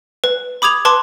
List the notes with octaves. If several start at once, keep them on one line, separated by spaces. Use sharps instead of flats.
B4
B5 D6 D#6 G#6 F7
B4 A5 C6 D6